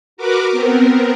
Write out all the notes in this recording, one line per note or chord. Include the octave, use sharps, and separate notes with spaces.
F#4 A#4 B4 D6
B3 C4 A#4